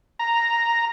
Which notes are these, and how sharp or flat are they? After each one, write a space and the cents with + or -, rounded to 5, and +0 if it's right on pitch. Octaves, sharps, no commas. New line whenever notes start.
A#5 +0